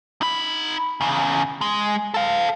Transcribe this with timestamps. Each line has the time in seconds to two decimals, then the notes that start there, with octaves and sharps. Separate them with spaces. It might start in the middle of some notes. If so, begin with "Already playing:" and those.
0.22 D#4 B5
1.01 E2 C#3
1.61 G#3
2.14 A4 F5